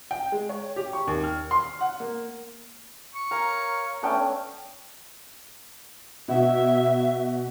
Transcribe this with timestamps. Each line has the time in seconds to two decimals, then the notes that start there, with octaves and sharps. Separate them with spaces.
0.11 G5
0.32 G#3
0.49 C#5
0.76 G4
0.93 C#6
1.07 D#2
1.24 F6
1.51 C6
1.81 F#5
2.00 A#3
3.14 C#6
3.31 A#4 C#5 F5 A#5
4.03 A3 B3 C#4 D4 G5
6.28 B2 E5